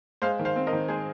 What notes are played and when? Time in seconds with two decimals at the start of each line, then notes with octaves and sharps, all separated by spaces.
0.22 G#3 C5 F5
0.40 D#3
0.45 C5 F5
0.56 C4
0.67 A#4 D#5
0.73 D#3
0.88 G#3 G#4 C5